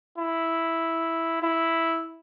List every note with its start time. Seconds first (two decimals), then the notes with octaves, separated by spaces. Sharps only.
0.18 E4
1.42 E4